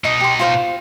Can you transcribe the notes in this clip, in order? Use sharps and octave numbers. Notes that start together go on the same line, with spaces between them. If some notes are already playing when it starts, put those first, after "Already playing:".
B2 D#4 D#5 D#6
G4 C6
F4 C5 F5